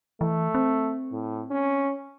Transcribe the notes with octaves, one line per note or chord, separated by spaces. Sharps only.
E3 A3
C4
A2
C#4